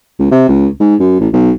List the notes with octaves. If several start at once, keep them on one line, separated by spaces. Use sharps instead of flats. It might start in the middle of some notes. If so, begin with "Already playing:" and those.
C#2
C3
C#2
G#2
F#2
A1
B1